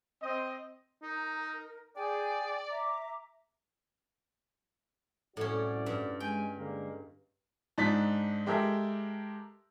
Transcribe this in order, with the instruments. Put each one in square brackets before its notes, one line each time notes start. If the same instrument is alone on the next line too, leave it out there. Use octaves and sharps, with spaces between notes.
[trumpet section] C4 D#5
[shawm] D#4 [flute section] A#4
[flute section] G#4 G5 G#5 [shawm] D5
[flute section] E5 A#5 D6
[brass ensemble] C2 F#4 D5 [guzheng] A2 C#4
[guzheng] G2
[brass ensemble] G#3 G#5 [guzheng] G5
[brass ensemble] D3 G#3 A#3
[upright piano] G#2 D4 D#4 A6 B6
G#3 G4 A4 A#4 E5